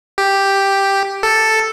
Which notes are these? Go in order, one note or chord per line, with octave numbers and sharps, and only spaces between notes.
G4
A4